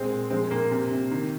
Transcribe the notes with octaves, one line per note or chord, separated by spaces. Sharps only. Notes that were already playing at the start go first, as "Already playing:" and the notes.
Already playing: A#2 G#3 C4
A#2
F3 G#3 C4
A#2 A#3
C3
C3
D#3